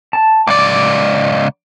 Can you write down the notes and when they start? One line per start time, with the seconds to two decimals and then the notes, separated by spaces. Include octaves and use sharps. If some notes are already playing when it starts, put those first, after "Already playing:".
0.13 A5
0.47 C#2 D5 D6